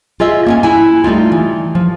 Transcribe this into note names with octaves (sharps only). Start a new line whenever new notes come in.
F4 G#4 D#5 E5
A#3 C#4 G#5
E4 G#5
G3 A3 D#4 F4
E3
F3